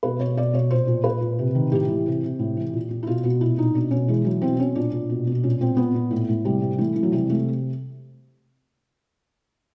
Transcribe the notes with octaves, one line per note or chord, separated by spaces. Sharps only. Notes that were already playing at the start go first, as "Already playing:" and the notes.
B2 B4
B2 C#5
B2 D5
B2 C#5
A#2 C5
A#2
A#2 B4
A#2
C3
D#3
A2 G4
E3
C3
C3
A2
E3
A#2
A#2
E4
B2 F4
B2 F#4
A#2 E4
A#2 D#4
B2 D4
B2 C#4
E3 G#3
E3 F#3
B2 C4
B2 C#4
A#2 D4
A#2
B2
B2
A#2 C#4
A#2 C4
A#2 B3
A#2
A2 A3
A2
C3 G3
C3
E3 A3
E3
F#3
C3 G3
C3 A3